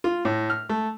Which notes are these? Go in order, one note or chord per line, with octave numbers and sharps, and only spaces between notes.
F4
A2
F6
A3